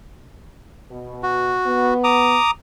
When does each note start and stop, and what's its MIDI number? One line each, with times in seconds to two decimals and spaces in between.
0.90 1.57 47
1.23 1.94 66
1.65 2.36 59
2.04 2.51 82
2.04 2.51 86
2.04 2.51 87